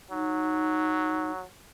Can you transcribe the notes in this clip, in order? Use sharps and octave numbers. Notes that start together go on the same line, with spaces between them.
F#3 D#4